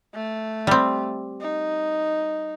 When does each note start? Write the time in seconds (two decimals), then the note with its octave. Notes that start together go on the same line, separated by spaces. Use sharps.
0.14 A3
0.67 G3 C4
1.41 D#4